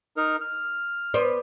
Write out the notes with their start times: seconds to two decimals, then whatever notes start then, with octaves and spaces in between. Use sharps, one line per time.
0.17 D#4 A#4
0.41 F6
1.14 B3 C5 D5